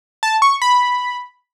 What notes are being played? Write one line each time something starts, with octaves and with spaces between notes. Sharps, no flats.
A5
C#6
B5